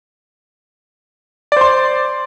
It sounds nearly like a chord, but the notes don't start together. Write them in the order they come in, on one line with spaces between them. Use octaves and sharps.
D5 C5 C6